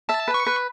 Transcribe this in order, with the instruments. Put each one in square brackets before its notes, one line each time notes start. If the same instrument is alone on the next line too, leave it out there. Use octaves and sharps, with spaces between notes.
[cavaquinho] E5 [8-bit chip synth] A5
[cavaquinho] B4
[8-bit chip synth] C#6
[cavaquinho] B4